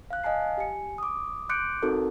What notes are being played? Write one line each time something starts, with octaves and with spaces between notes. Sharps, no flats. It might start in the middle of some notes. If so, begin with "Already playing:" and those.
F5 F#6
D#5 F5 G#5 A5 C7
G4 G#5 C#7
D6 D#6
C6 D6 F#6 G6 C#7 D7
C4 D#4 F#4 A4 A#4 A5